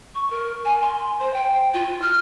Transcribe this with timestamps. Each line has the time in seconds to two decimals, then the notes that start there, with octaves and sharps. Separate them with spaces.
0.14 C#6
0.30 A#4
0.65 G#5
0.81 C6
1.19 C5
1.33 G5
1.73 F4
2.01 F6